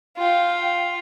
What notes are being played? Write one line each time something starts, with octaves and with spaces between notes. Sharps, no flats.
F4 F5 G5